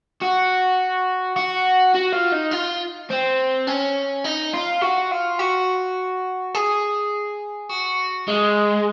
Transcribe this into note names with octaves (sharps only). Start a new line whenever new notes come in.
F#4
F#4
F#4
F4
D#4
F4
C4
C#4
D#4
F4
F#4
F4
F#4
G#4
F#4
G#3